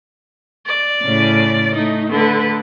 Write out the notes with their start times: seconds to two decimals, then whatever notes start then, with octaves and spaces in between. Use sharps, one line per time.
0.66 D5
1.02 A2 C#3 C#4
1.75 A3 D#4
2.10 D3 A3 B4